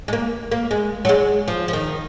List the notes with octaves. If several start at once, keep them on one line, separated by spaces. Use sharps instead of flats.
G#3
A#3
A#3
G#3
F#3
G#3
F3
F3
D#3